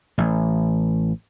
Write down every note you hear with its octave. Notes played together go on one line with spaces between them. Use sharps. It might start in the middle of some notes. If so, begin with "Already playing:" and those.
A1